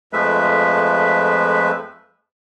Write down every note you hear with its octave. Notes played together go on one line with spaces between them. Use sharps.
F2 F3 G#3 A3 B4 E5